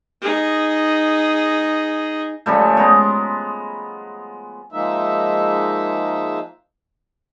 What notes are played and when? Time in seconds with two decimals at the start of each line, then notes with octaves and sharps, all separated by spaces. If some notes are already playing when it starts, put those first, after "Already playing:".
0.22 D#4 G#4
2.46 C#3 F3 G3 A3
2.77 G#3 B3 A#5
4.72 F3 G#3 A#3 D#4 E5